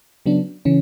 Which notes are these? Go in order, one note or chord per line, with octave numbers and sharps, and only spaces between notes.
C#3 F#3 B3 D4
C#3 E3 C#4